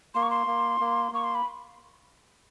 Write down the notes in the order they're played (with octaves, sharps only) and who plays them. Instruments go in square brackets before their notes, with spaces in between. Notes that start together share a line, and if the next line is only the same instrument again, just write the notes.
[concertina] A#3 [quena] C6
[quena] C#6
C6
[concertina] A#3
A#3
[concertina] A#3 [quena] C#6
[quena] C6
B5